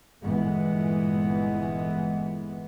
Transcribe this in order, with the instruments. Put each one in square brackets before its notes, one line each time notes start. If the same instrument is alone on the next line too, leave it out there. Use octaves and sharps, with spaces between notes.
[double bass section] G1 A#2 E3 G#3 B3